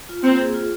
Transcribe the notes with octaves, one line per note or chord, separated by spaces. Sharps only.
F4
A#3 C4
G#4
F4